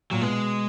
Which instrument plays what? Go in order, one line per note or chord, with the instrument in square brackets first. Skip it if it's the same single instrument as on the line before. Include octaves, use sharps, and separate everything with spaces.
[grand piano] A#2 [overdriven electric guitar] F#3
[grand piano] B2 [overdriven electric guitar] G#3